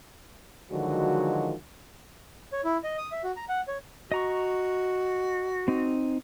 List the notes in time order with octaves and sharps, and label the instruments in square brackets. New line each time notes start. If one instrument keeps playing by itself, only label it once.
[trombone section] D3 D#3 F3 F#3 G#3 F#4
[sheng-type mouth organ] C#5
E4
D#5
D#6
E5
F#4
A#5
F#5
C#5
[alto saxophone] F#4 [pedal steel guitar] D#5 A#5 C#6
[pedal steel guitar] C4 D#4